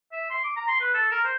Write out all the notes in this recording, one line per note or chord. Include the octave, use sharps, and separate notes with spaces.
E5
C6
D6
A#5
C6
B4
A4
A#4
C5